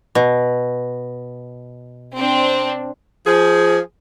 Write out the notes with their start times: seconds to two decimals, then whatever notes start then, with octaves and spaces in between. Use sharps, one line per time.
0.15 B2
2.16 C4 D4
3.27 F3 G#4